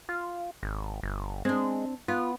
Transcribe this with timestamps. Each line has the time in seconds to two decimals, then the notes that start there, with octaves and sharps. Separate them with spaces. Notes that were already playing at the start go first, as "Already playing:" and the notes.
0.09 F4
0.63 G#1
1.03 G1
1.45 G#3 C4 D4
2.08 B3 F4